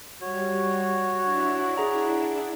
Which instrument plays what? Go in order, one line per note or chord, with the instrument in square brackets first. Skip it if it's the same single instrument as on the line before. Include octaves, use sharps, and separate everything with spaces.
[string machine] G3 [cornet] F#4 [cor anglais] C#5
[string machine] D4 E4
[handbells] G#4 A#5 [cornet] F#5